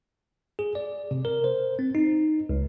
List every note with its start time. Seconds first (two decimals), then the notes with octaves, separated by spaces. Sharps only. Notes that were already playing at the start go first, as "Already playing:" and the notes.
0.59 G#4
0.75 D5
1.11 C3
1.25 A#4
1.44 C5
1.79 C4
1.95 D#4
2.49 C#2